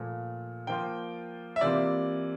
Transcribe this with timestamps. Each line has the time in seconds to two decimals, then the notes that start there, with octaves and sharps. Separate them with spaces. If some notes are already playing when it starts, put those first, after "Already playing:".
Already playing: A#2 F3 A3
0.67 F3 A#3 F4 G5
1.56 E5
1.61 C3 E3 A#3 F4 D5